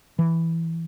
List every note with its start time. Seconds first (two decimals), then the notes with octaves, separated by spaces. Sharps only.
0.19 E3